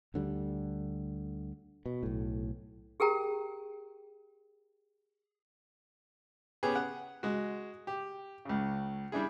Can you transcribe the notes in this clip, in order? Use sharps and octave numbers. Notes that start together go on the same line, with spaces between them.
D2 D3 F3 G3
B2
B1 A2
G4 G#4 A#4 G5 A#5
B3 C#4 G4 G#4
F#5
G#3 F#4
G4
C#2 C#3
G3 D4 E4 G#4